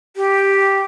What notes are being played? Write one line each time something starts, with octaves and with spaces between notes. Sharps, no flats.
G4